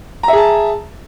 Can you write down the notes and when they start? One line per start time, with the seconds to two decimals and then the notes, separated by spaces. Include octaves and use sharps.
0.23 A#5
0.28 E5
0.33 G#4
0.38 A5